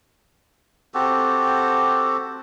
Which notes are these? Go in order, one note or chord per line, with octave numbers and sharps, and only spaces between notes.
C4 F#4 G4 A4